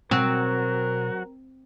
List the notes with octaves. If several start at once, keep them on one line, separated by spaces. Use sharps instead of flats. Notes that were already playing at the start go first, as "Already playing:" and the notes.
B2 F#3 C4 F#4 A#4